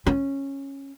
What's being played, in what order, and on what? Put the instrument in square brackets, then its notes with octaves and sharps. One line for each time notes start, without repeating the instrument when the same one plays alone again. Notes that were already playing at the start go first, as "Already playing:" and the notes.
[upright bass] C#4